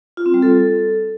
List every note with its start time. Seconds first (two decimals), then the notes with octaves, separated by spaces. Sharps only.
0.17 F4
0.26 C4
0.34 G3
0.42 A4